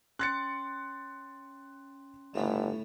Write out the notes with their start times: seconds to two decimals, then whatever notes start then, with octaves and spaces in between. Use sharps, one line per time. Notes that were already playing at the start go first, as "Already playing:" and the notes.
0.19 C#4 C6 F#6 A6 C#7
2.34 G1 A2 C#3 A3